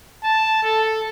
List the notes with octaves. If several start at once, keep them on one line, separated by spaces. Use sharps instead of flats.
A5
A4